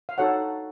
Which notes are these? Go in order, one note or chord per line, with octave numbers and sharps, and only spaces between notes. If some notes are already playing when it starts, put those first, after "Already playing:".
F5
D#4 F#4 A4 C#5 F#5